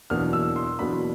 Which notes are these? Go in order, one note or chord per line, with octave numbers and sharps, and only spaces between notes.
E2 B2 F#3 A#3 D4 F6
E6
C6
E2 B2 F#3 A#3 D4 B5